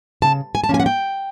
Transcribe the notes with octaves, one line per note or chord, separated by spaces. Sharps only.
C#3 A5
G#5
A5
F3 A#3 C#4 G#5
F#5
G5